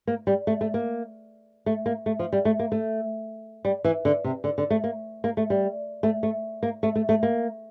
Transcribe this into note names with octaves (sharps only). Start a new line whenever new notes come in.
A#3
G3
A3
A3
A#3
A3
A#3
A3
F3
G3
A3
A#3
A3
G3
E3
D3
C3
D3
D3
A3
A#3
A#3
A3
G3
A3
A3
A#3
A3
A3
A3
A#3